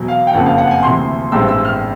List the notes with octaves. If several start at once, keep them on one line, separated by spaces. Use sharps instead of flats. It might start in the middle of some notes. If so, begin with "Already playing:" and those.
Already playing: E2 B2 F#3
F5
G5
F#1 F2 C#3 F3 F#5
F5
F#5
G#5
D2 C3 E3 C6
A1 G2 E3 G#3 C4 E6
E6
F6